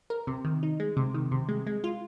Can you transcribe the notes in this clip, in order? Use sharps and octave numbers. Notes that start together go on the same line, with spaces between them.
A#4
C3
D#3
D#4
G#3
C3
D#3
C3
G#3
G#3
F4